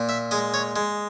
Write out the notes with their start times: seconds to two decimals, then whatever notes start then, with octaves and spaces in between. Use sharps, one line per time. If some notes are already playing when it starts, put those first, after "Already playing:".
Already playing: A#2
0.09 E5
0.31 G#3 D#5
0.54 C#5
0.76 G#3